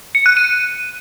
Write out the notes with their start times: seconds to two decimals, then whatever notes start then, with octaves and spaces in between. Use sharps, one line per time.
0.15 C#7
0.26 F#6
0.37 D#7